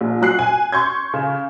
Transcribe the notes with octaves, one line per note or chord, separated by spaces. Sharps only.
A#1
F#3 F#6 C7
G#5
C6 C#6 G6 G#6
C#3